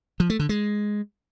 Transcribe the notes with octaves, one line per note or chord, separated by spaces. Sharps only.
F3
A3
D3
G#3